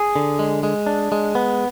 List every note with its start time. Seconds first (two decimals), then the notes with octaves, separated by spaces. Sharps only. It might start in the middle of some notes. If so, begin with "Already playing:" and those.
Already playing: G#4
0.16 D3
0.39 G#3
0.63 G#3
0.87 D4
1.12 G#3
1.35 B3